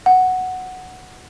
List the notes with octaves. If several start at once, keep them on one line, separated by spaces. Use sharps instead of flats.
F#5